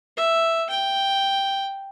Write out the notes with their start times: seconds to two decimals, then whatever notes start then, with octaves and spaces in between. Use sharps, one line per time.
0.17 E5
0.70 G5